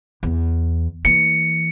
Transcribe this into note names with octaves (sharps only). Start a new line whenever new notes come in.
E2
E3 A#3 C#7